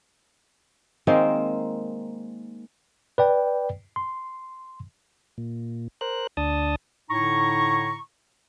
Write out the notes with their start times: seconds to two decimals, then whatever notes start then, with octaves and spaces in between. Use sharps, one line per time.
1.07 D#3 G#3 A#3 C4
3.18 B4 D5 G5
3.96 C6
5.38 A#2
6.01 A#4 C5 F#6
6.37 D2 D4 A5 D#6
7.10 A2 D3 D#4 E4 A#5 C#6